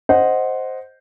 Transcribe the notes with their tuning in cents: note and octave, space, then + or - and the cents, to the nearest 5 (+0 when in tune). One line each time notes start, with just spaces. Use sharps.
C5 +0 D#5 +0 F#5 +0